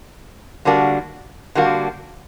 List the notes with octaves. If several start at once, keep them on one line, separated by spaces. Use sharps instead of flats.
D3 G3 A#3 D4 F#4
D3 G3 A#3 D4 F#4